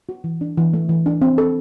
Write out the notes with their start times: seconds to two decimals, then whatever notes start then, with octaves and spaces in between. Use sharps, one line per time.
0.09 F#4
0.24 E3
0.41 D4
0.57 E3
0.74 A3
0.89 E3
1.06 D4
1.22 C4
1.38 A4